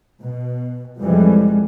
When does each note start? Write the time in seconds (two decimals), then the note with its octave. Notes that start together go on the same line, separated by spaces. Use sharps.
0.21 B2
1.00 F1 F2 E3 G3 G#3